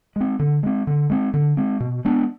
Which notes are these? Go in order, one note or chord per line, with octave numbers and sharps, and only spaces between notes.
G#3 C4
D3
G#3 C4
D3
G#3 C4
D3
G#3 C4
B2
G#3 B3 D4